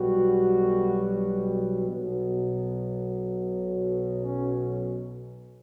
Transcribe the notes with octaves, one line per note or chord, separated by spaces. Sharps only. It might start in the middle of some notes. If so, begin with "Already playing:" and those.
Already playing: B1 B2 G3 F#4
B1 B2 F#3
C#4